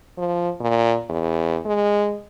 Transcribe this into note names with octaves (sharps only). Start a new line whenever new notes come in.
F3
A#2
E2
G#3